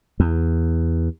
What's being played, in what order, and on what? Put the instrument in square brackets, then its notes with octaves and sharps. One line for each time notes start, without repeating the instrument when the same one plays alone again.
[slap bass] E2